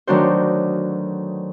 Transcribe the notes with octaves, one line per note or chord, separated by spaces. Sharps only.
D2 D#3 F#3 D4 F#4 C5